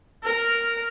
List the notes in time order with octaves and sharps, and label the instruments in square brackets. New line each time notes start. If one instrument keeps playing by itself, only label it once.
[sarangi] A#4